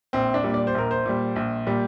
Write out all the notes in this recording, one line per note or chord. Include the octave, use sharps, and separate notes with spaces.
A#1 C4
D4
A#2 G3
D5
C5
A#1 A#4
C5
A#2 G3
A#1
A#2 G3